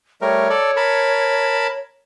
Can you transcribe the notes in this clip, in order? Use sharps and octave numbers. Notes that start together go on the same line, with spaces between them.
G3 A3 A#4 C#5
A4 D5
A#4 A5 B5